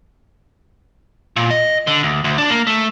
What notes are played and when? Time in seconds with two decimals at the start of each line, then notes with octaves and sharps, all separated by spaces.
1.36 A#2
1.50 D#5
1.87 D3
2.03 D2
2.24 D2
2.38 D4
2.50 A#3
2.67 A3